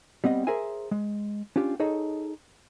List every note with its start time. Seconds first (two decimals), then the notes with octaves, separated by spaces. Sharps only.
0.24 G3 B3 C4 D#5
0.47 G#4 A#4 C5 E5 G#5
0.91 G#3
1.56 C#4 D4 F4 G4
1.80 D#4 G#4 A4 C#5 D#5